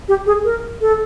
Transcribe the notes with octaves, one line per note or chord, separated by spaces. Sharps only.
G4
G#4
A#4
A4